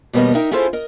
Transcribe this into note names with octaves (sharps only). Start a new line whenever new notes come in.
D#2 B2 G3 B3 A#4 D#5
D#4 A#4 E5 G5
C#4 E4 F4 G#4 A4 C5
A#4 D#5